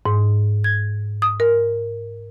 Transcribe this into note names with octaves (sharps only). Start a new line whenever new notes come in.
G#2
G#6
D#6
A#4